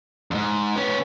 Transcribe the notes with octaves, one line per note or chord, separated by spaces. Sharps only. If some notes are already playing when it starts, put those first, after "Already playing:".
F2 G#2
B3 C#4